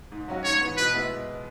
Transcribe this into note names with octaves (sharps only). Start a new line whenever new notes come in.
G#2
F#3 C#4 F#4
G#2 C#5
E3 B3
B2 B4
G#3 B3 E4